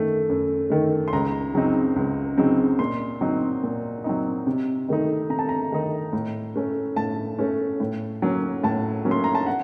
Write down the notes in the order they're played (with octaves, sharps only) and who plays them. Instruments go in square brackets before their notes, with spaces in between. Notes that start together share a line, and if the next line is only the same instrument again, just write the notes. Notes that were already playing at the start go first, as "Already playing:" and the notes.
Already playing: [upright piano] F#2 D#3 A3
F#2
D#3 A3
C6
C#2 A#5
C#3 F#3 C4 D#4
C#2
C#3 F#3 C4 D#4
A#2 C6
F#3 C4 D#4
A#2
F#3 C4 D#4
C3
D#3 A3 D#4
C3 A#5
A5
A#5
D#3 A3 D#4
A2
A3 C#4
A2 A5
A3 C#4
A2
F#3 A#3 C#4
A2 A5
F#3 A#3 C#4
C6
A#5
A5
F#5